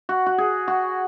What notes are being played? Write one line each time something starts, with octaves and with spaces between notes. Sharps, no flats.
F#4
F#4
G#4
F#4